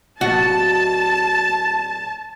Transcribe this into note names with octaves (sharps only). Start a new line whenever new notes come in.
D1 F#4 A5